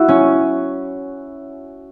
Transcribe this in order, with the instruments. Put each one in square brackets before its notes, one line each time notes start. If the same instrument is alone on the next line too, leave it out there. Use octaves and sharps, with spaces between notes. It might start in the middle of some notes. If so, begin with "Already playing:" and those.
Already playing: [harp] E4 F#4
C#4